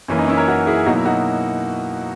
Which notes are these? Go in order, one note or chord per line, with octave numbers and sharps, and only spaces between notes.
F#2 E3 A#3 C#4
D#4
C#4 E4
A#4 C#5
F#4 A#4
E4 G#4
B2 F#3 A#3 D#4 F#4
E4
D#4 F#4